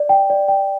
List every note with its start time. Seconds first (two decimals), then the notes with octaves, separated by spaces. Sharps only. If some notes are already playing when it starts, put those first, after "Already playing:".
Already playing: D5
0.09 G5
0.30 D5
0.48 G5